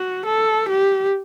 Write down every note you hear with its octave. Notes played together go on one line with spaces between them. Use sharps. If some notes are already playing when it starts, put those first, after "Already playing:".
Already playing: F#4
A4
G4